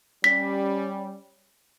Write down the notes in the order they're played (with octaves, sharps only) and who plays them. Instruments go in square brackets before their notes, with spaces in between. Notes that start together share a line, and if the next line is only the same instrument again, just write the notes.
[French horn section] G3 C#4 [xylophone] B6